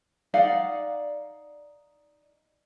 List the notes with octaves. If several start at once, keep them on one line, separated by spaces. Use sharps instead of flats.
D#4 D5 F5 F#5